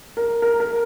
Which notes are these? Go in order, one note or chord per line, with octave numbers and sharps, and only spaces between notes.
A#4
A#4
A#4